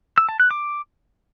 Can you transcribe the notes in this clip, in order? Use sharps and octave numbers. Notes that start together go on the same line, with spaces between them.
E6
A5
F#6
D6